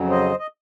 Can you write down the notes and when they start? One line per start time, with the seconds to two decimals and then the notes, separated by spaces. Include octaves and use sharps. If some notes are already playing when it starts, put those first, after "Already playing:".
Already playing: F2 C#3 F#3
0.10 C5 D#5
0.39 D#5